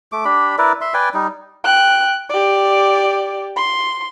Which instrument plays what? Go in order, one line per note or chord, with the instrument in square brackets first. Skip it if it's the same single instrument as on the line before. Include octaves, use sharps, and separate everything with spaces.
[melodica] A3 D6
D4 G4 B5
E4 A#4 B4 D5
E5 C6
B4 D5 G5 G#5
G3 D#4
[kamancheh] G5 F#6
G4 D5
C6